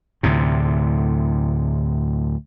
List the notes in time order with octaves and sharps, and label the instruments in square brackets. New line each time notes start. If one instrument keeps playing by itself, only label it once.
[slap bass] D2 A2 C3